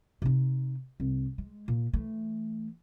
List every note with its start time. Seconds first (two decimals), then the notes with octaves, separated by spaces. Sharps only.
0.22 C3 D#4
1.00 C2
1.38 G#3
1.68 A#2
1.93 E3 A3